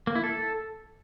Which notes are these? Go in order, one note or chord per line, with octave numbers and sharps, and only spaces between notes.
A#3
E4
A4